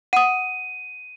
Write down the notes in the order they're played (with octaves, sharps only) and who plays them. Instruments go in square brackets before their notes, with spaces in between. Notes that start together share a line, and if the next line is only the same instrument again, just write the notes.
[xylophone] F#5 D#6 [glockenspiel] D#7